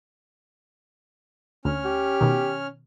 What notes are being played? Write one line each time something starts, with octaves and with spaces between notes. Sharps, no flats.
D2 C#4 F6
G4
B2 D#3